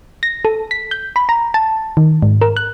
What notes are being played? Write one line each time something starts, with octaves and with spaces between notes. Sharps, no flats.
A#6
A4
B6
G6
B5
A#5
A5
D#3
G#2
A#4
F#6